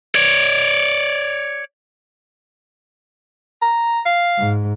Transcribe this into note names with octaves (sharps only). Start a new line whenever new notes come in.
C#5 D5
A#5
F5
G#2